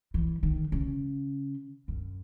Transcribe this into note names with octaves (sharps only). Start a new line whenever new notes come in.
E3
D#3
C#3
F#2